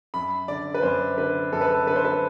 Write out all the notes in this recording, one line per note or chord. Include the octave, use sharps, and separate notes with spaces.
F#2 B5
D3 D5
B4
F#2 C5
D3 B4
F#2 A4
B4
A4
D3 B4
C5
B4